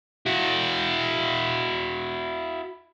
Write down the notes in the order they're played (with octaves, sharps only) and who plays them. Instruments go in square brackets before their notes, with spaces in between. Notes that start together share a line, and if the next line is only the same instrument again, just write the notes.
[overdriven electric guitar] E4 F#4